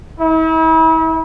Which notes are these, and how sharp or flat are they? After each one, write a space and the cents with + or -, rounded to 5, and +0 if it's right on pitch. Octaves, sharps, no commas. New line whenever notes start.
E4 -40